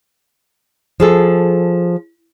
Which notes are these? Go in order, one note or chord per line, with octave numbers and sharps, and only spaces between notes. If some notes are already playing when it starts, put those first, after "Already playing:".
F3 G#4 A4